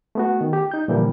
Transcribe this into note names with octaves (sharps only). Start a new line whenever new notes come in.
A3 B3 F#4
D#3
G4
D#4 G6
A#2 D3 E3 F3 G3 A#3